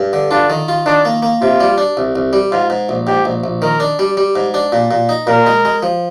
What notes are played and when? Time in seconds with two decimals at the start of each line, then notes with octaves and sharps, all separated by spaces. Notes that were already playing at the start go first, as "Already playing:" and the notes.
Already playing: G2
0.13 D3
0.31 D4 F4
0.50 D#3
0.68 F4
0.86 D#3 D4
1.05 A#3
1.22 A#3
1.41 C3 F4
1.60 G3
1.78 D4
1.97 C2
2.16 C2
2.33 G3
2.51 G#2 F4
2.70 G#2
2.89 A#1
3.07 G#2 G4
3.25 A#1
3.44 A#1
3.62 D#3 A#4
3.80 D4
3.99 G3
4.17 G3
4.36 G#2
4.54 D4
4.72 A#2
4.91 A#2
5.09 D#4
5.27 A#2 A#4
5.46 G#3
5.65 G#3
5.83 F3